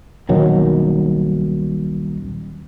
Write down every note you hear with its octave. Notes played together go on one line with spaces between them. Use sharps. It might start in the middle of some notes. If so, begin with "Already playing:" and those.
D#1 B1 D#3 F#3